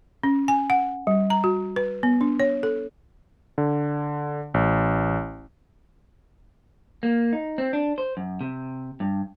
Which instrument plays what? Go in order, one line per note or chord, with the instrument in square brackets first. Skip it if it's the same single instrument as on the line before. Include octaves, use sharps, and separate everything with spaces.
[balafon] C#4
G#5
F#5
G3
A#5
F#4
B4
B3
D4
C#5
A4
[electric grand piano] D3
A1
[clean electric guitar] A#3
D#4
C4
D4
C5
F#2
C3
G2